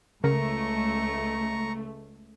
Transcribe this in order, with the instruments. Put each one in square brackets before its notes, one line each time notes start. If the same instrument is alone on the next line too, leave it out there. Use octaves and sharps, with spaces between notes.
[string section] C#2 A3 [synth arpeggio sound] C#3 A#4 A#6 [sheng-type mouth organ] A#5 C#6